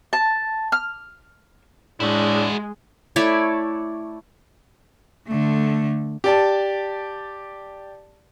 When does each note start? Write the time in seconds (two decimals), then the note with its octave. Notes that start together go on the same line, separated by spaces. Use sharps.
0.13 A5
0.72 F6
2.00 A2 G#3 D4 E4 F#4
3.16 A3 E4 C#5 D5
5.28 D3 A3
6.24 G4 D5 A5